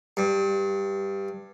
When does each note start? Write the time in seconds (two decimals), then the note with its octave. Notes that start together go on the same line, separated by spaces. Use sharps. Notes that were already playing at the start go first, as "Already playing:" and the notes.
0.17 G2